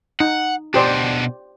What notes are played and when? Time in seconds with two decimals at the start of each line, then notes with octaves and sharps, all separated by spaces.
0.20 D#4 F#5
0.74 B2 D4 G4 C5 D5